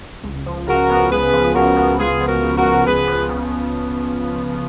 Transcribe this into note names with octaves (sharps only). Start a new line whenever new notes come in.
C#2
F3
C#3 F#4 A#4
B3
C#2 G#4 B4
F3
C#3 F#4 A#4
B3
C#2 F4 G#4
F3
F#4 A#4
C#3
F#4 A#4
C#2
C#2 G#4 B4
F3
C#3